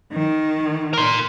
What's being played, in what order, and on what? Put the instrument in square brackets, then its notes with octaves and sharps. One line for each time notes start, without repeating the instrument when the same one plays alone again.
[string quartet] D#3
[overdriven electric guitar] A#4 C6